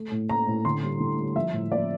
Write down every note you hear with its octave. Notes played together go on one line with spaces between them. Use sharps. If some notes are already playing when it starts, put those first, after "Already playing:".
Already playing: A3
A2
A3 A#5
A2
D3 C6
G3
D3
G3
F3 E5
A2
F3 D5